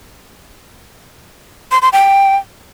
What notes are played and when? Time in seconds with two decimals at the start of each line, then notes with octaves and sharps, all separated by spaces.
1.72 C6
1.82 C6
1.93 G5